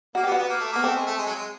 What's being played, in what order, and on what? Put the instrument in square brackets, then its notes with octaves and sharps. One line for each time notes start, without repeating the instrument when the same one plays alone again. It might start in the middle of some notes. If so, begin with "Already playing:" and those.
[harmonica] A#3 [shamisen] F#4
[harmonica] B3 [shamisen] G4
[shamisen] F#4
[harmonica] B3
A#3
A3
[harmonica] A#3 [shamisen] B3
[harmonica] A3 [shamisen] C4
[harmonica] G#3
A3
G#3
F#3
G#3